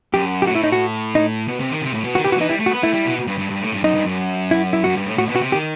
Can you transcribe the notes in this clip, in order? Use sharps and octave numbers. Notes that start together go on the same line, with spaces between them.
F#2 G4
G4
A2 F#4
E4
D#4
F#4
D#4
B2
C3
D#3
C3
A2
B2
D#3 F#4
E3 G4
F#4
E3 D#4
G3 E4
A3
F#4
B3
A3 E4
G3
B2
G2
G2
G2
A2
G2
F#2 D#4
G2
F#2
E4
E4
F#2 F#4
G2
A2
A2 F#4
B2
F#4
C3
D#3 G4